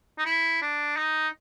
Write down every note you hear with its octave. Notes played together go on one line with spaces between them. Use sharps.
D#4
E4
D4
D#4